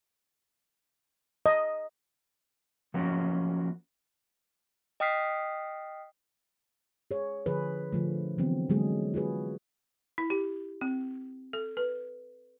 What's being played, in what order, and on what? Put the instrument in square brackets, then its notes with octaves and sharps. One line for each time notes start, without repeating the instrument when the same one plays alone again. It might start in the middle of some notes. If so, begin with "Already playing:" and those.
[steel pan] D#5
[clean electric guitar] F3 F#3 A#3 C#4 F#4
[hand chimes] D#5 G5 D#6 F6 B6 C7
[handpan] G#4 C#5
D3 F3 G#4 B4
D3 F3 A3
D3 E3 F#3 B3 C4
D3 F#3 G#3 A#3 G#4
F4 F#4 G#4 B4
[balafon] E4
G4
C4
A4
B4